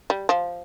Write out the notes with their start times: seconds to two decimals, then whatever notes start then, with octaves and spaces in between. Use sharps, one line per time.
0.10 G3
0.29 F3